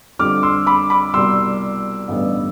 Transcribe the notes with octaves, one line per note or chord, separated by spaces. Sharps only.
F2 D3 G3 D6 F6
C6 E6
B5 D6
B5 D6
C2 B2 G3 C6 E6
A1 G2 D3 G3 B3